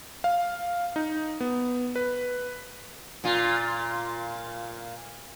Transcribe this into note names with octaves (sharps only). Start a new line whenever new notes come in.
F5
D#4
B3
B4
A#2 F4